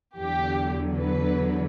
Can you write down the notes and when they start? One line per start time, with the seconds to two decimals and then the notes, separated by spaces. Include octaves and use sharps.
0.17 E2 D3 F#3 G4
0.99 B4